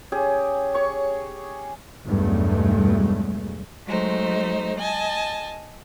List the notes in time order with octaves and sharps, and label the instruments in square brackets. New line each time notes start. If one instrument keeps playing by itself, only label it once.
[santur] C#4 G4 G#4
C#5 C#6
[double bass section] B1 E2 G2 F#3 G#3 A3
[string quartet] F#3 G#3 A3 D#4 C5
D#5 G#5 A5